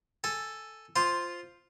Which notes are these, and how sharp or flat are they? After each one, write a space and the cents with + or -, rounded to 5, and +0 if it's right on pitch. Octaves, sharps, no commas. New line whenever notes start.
A4 +0 G#5 +0
F4 +0 C5 +0 D#6 -25